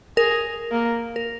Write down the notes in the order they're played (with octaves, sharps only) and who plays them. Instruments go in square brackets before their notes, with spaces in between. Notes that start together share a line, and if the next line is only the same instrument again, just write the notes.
[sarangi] G#4 [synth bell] A#4
[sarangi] A#3
[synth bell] A#4